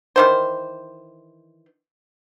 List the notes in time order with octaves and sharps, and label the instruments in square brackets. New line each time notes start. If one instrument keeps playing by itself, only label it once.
[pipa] D#3 E3 C5